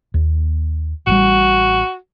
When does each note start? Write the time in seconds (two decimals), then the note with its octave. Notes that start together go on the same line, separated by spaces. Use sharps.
0.14 D#2
1.07 A1 A2 G3 F#4